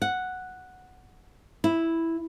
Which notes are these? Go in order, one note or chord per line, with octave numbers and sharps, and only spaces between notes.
F#5
E4